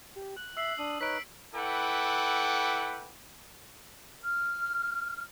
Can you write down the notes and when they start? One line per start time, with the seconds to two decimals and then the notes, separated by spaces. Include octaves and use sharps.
0.16 G4
0.37 F#6
0.57 E5 E6 C7 F#7
0.78 D4 D#6
1.01 D#4 B4 C#5 B6 D7
1.55 E4 A4 B4 F#5 G5 D6
4.22 F6